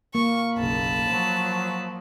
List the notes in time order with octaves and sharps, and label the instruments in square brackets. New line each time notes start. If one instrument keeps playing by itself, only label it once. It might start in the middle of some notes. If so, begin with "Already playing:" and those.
[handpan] A#3 [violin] C#6
[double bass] F#1 B1 [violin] A5 B5
[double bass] F3 F#3